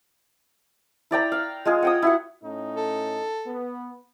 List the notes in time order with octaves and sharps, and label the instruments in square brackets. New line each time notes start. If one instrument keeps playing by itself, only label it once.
[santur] E4 D5 G5 A#5
F5
G#3 F4 G#4
F#5 G5 D#6
E4 F#4 F#5
[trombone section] A2 C#4 D#4
[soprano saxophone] A4
[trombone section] B3